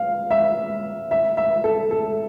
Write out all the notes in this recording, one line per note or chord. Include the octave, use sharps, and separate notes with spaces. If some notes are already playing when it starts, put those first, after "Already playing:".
Already playing: F5
E5
E5
E5
A4
A4